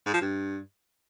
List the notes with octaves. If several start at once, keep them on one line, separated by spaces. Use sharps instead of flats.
G#2
F3
G2